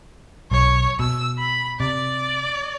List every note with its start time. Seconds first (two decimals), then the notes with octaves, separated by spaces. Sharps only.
0.51 B1 C#5
0.99 B2 E6
1.38 B5
1.80 C3 D5